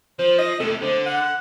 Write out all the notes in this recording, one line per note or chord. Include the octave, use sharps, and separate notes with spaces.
F3 C5
D#5
A2 C3 A4
D3 C5
F#5